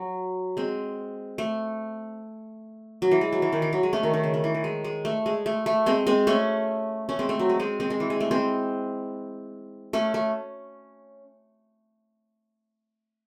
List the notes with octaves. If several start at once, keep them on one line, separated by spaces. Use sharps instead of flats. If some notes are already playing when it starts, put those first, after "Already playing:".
Already playing: F#3
G#3 C4
A3
F#3
E3
G#3
F#3
E3
D#3
E3
F#3
G#3
A3 C#4
D#3
D#3
C#3
D#3
E3
D#3
G#3
G#3
A3
G#3
A3
A3
G#3 C4
G#3 C4
A3 C#4
A3 C#4
G#3 C4
A3
F#3
G#3
G#3 C4
G#3 C4
G#3 C4
E3
G#3
A3
G#3 C4
A3 C#4
A3